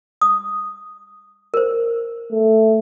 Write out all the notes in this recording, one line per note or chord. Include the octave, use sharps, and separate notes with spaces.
D#6
A#4 C5
A3